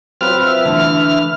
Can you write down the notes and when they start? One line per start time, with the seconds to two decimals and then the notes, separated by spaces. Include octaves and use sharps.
0.21 F#3 C4 F4 B4 F6
0.43 E5
0.65 D3 E3 A3